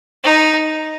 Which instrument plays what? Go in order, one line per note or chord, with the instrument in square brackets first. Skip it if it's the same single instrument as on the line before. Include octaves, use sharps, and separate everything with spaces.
[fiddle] D#4